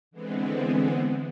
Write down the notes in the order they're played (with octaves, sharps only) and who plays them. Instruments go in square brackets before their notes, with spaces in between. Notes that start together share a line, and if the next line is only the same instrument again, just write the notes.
[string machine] D3 E3 G#3 B3 C4